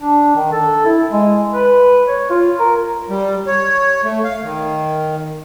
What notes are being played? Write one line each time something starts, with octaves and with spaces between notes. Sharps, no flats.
D4
D#3
A4
E4
G#3
B4
C#5
F4
A#4
G3
C#5
A3
F5
D#3